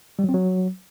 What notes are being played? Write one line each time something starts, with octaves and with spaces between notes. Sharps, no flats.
G3
F#3
C4
F#3